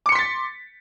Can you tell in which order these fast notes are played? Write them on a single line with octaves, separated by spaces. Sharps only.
D6 C#7 C6 B6 A6